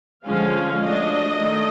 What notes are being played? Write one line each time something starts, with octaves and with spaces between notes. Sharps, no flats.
D3 F3 G#3 C#4 F5
F#3 A3 D4 D#5
D#3 F#3 A3